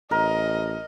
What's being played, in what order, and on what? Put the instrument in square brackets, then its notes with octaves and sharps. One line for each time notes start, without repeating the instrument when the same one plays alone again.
[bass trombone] A1 [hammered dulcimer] A#4 [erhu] D#5